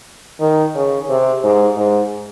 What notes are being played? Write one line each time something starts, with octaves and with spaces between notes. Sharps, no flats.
D#3
C#3
C3
G#2
G#2